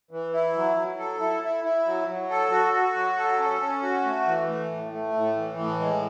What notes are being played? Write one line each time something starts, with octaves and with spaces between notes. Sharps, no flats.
E3
E4
F#3
F#3
A4
E4
E4
E4
F#3
F#3
A4
F#4
F#4
F#3
A4
C#4
C#4
F#4
A3
E3
A3
A2
A3
A2
E3
A2
G#3